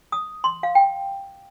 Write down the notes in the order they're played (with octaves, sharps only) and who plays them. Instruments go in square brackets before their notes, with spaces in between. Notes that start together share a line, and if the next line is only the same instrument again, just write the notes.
[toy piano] D#6
C6
F5
G5